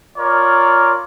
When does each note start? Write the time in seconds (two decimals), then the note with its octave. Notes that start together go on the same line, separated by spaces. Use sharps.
0.17 F4 A#4 C#5 D5